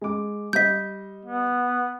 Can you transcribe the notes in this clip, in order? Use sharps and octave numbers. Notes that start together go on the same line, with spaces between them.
G#3 D6
G3 D#5 G6 B6
B3